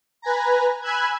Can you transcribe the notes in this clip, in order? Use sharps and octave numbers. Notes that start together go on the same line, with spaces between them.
B4 G#5 A#5
G#5 B5 E6 F#6 G#6